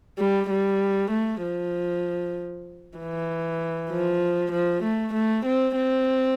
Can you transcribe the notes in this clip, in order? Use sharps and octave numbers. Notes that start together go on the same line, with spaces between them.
G3
G3
A3
F3
E3
F3
F3
A3
A3
C4
C4